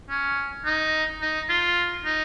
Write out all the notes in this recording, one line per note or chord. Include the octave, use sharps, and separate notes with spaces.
C#4
D#4
D#4
F4
D#4